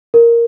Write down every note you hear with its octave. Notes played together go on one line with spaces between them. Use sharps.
A#4